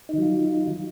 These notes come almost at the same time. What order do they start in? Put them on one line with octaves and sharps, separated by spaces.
D#4 D#3 F#3 F4